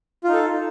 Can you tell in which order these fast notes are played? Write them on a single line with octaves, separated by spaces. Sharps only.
F4 D#4 A4